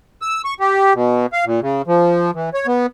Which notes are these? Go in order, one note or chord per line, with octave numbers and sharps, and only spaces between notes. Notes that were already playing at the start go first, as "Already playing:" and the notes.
E6
C#6
G4
B2
F5
A#2
C#3
F3
E3
C#5
B3